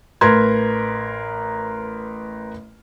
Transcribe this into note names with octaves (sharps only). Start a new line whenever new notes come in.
A1 A#4 B4 A#5 C6 G#6